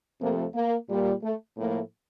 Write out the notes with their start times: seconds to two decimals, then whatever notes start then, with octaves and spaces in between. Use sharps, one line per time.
0.21 F2 C3 F3 A3 A#3
0.54 A#3
0.89 A#2 G3
1.23 A3
1.57 A2 F3 A3 A#3